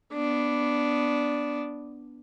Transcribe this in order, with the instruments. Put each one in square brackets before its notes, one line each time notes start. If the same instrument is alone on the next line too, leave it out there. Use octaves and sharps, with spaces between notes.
[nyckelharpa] B3 D4